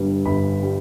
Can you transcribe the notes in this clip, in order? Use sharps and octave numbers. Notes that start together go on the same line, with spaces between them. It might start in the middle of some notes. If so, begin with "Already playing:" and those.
Already playing: G1 G2 G3
G1 B5
G3